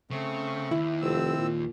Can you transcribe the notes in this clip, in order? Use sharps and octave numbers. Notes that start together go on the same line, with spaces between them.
C#3 A3 C4 C#6
D#2 E4
F1 C4 E6
A#2